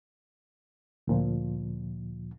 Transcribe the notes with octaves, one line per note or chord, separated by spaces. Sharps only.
D2 A#2 F3